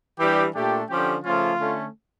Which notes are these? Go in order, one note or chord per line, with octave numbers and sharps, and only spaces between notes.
E3 G3 D4 G4
A#2 A3 D4 G4
D3 F3 C#4 G4
C#3 F3 A3 C#4 F4
D3 A3 C#4